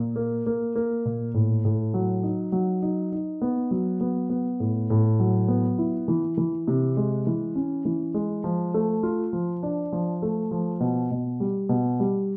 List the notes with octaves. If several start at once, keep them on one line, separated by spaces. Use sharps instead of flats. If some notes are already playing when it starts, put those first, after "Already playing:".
Already playing: A#2
A#3
A#3
A#3
A#2
A2
A2
F#3
D#4
F#3
D#4
D#4
B3
F#3
B3
B3
A2
A2
F#3
B3
E4
E3
E3
C3
G#3
E3
C#4
E3
G#3
F3
A3
F4
F3
D4
F3
A3
F3
B2
B2
G3
B2
G3